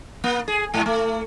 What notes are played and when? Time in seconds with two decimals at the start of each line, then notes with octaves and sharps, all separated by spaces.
0.24 A#3
0.48 G#4
0.74 G#2
0.86 A3